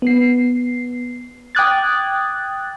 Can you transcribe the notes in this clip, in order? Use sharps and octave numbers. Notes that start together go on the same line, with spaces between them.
B3 C7
G5 D6 D#6 F#6 G#6 A6